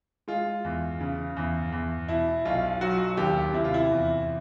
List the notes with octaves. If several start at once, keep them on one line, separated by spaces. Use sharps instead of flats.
G#3 F4
E2
C#3
E2
E2
B2 E4
B1 F4
F#3 F#4
D#2 G4
C3 E4
F4
E4
E2